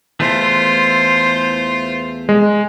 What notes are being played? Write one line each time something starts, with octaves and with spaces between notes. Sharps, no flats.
E2 E3 A3 F4 C5
G#3